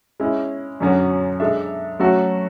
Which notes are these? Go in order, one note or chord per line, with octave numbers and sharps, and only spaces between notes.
G#3 C#4 E4
F#2 D3 F#3 C#4 F#4
G#3 D4 A4 E5
F#3 A3 C#4 F#4 A4